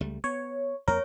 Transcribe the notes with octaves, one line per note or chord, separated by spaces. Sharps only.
C#2 G3 A3
B3 C#5
F2 A#3 A#4 C#5